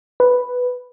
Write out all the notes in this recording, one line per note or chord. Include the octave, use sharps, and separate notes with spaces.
B4